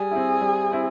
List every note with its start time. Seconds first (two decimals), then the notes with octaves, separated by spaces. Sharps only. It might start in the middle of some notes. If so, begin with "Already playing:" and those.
Already playing: G3 G#4
0.11 C4 E4
0.41 G3
0.72 C4 E4